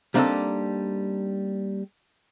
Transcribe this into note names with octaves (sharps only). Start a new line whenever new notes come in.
G3 A#3 C4 D4 D#4 A4